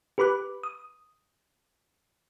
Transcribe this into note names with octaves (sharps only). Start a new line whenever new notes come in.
G4 B4 B5 D6 F#6
D#6